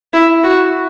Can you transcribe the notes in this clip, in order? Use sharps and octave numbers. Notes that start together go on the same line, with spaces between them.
E4
F#4